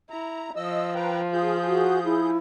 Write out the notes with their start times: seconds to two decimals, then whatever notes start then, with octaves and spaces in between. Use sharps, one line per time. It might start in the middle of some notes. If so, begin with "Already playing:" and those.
0.10 E4 A#5
0.56 F3 D#5 E6
0.95 B4 G5 A#5
1.33 F4 G#4 G6
1.67 F#4
2.05 E4